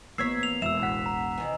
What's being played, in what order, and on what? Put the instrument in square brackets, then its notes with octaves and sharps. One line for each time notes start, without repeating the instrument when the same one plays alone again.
[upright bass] A1 [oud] A#3 B3 C#5 [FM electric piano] E6 G#6 B6 [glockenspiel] C7
[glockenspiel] F7
[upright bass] E1 [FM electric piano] E2 E5 [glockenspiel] E6 E7
[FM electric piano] A1 F#5 B6
[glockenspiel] A#5
[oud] C3 D#3 E3